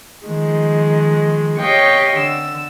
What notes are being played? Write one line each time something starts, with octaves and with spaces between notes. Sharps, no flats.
D#3 F3 G#3
G4 C#5 D#5 F5 G5 C#6
D3 E6